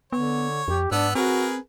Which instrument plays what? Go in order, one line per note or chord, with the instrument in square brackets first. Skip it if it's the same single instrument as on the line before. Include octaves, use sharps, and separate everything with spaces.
[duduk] D3 [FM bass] B3 [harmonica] C#5
[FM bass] F2 [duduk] G4
[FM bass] G#2 [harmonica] B3 F#5 E6 [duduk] D4
[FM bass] C4 [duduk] F#4 [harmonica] G#4 A#4 B4